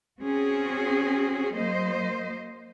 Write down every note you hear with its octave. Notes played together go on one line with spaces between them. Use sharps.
C4 C#4 F#4 G#4
F#3 A#3 C5 D#5